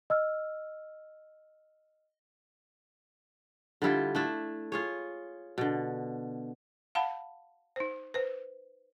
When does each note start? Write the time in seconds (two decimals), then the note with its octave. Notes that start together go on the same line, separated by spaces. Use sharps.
0.10 D#5 E6 F6
3.82 D3 G3 E4 F4
4.15 A3 D4 E4
4.72 F4 G#4 C#5
5.58 B2 D3
6.95 F5 F#5 A5 B5
7.76 D#4 C5
8.14 B4 C5